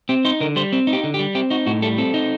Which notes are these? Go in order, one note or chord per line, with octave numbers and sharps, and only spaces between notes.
C4 G4
D#4 C5
D3 A#4
G3 C5
C4
D#4
G4
D3
G4
G3
C4 G4
D#4 F#4
A2 F#4
G3 A4
C4 A4
D#4